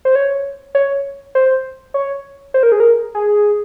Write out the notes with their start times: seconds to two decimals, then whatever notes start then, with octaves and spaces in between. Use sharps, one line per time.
0.05 C5
0.15 C#5
0.75 C#5
1.35 C5
1.94 C#5
2.54 C5
2.63 A#4
2.72 G#4
2.80 A#4
3.15 G#4